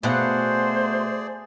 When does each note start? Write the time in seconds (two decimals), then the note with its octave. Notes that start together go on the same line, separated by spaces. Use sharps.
0.03 B2 A3 G#4 C5 D5 F5 F#5